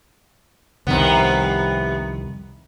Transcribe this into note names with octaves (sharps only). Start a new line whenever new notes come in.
C2 F2 C3 D#3 B3